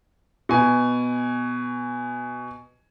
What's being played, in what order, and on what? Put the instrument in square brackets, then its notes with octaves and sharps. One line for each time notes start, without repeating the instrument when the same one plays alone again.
[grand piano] B2 G#5